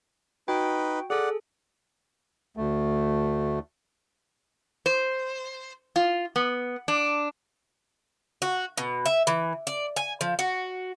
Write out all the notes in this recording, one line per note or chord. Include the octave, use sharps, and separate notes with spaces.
D#4 F#4 B4 G5
G#4 A4 D5 F#5
D2 A3
C5
F4
B3
D4
F#4
B2
E5
E3
D5
G#5
F3
F#4